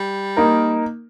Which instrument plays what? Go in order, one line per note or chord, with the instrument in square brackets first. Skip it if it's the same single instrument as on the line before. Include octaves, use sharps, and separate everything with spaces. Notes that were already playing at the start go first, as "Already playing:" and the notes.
Already playing: [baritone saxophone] G3
[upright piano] A#3 D#4 A#4